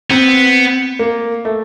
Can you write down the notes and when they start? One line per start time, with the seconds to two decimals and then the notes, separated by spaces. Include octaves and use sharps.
0.10 B3 C4
0.99 A#3
1.45 A3